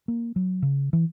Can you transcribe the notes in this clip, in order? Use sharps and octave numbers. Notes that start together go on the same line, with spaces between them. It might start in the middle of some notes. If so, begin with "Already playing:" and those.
A#3
F#3
C#3
E3